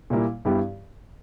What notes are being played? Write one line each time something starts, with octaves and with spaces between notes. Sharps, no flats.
A#2 G3 A#3 E4
G2 G3 B3 E4 G4